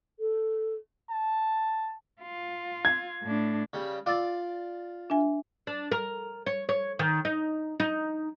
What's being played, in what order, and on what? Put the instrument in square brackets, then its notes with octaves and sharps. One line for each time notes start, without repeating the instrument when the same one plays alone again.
[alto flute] A4
[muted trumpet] A5
[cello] F4
[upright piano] G#6
[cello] A2 D4
[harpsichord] C#3 G3
[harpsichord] F4 D5 [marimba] D6 E6 A6
[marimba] D4 E5 G#5
[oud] D4
A#4
C#5
C#5
D#3
D#4
D#4